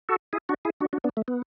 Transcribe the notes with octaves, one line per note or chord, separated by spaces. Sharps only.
F#4 A4
E4 G#4
D4 F#4
E4 G#4
D4 F#4
D4 F#4
B3 D4
A3
B3